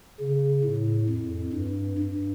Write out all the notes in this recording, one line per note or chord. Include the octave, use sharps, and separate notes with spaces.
C#3
A2
F2
G2
G2